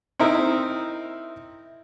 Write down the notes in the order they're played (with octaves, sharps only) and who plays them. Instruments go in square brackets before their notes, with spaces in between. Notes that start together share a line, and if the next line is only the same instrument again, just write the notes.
[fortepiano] C4 D#4 E4 A#4